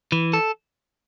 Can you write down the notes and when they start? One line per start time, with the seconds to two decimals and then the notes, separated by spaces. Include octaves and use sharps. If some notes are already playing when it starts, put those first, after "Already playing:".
0.12 E3
0.33 A4